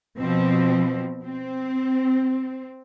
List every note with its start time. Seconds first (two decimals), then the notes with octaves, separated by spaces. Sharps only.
0.18 B2 F3 C4
1.25 C4